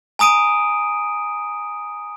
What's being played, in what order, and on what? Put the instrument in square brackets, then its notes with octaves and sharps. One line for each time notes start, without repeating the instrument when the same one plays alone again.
[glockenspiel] G#5 A#5 D#6 D7 D#7